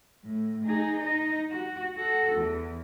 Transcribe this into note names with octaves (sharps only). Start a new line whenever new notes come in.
A2
D#4 G#4
D#4 D#5
F#4
F#4 A4
E2